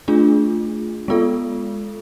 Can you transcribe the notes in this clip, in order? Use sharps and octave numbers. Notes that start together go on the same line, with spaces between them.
A3 D4 F4 G#4
G#3 B3 F4 A4